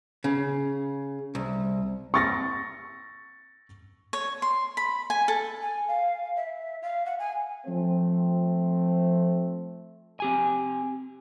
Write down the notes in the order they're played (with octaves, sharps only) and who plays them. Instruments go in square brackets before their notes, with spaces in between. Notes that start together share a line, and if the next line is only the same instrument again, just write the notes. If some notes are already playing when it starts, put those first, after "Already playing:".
[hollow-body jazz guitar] C#3
C2
[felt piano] C#6 A6 A#6
[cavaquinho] C#5
C6
B5
G#5
A4
[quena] G#5
F5
E5
F5
F#5
G#5
[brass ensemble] F3 A3 C4
[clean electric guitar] C4 G4 G#5